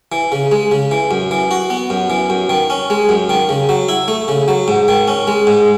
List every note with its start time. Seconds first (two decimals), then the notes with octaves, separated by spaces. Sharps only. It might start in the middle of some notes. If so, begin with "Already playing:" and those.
0.12 E3
0.32 C#3
0.52 G#3
0.72 C#3
0.91 E3
1.11 F#2
1.31 E3
1.51 F#4
1.70 B3
1.90 F#2
2.10 E3
2.30 F#2
2.49 D#3
2.70 C#4
2.90 G#3
3.09 F#2
3.29 D#3
3.49 C#3
3.69 F#3
3.89 E4
4.08 A3
4.28 C#3
4.48 F#3
4.68 G#2
4.88 D#3
5.08 C#4
5.27 G#3
5.47 G#2